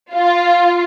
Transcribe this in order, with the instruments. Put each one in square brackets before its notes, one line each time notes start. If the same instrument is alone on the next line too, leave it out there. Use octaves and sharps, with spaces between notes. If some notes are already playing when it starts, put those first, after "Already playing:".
[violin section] F4